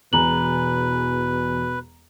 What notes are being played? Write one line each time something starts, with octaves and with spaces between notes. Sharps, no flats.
E1 E2 B2 B4 A#5 F#7